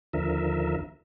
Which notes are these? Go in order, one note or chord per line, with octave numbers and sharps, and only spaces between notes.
D#2 D3 F3 A#4 E5